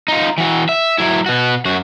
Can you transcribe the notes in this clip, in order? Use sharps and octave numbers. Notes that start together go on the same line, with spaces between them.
D#4 F4
E3 F#4
E5
F#3 E4
B2 F#4
F#2 F#4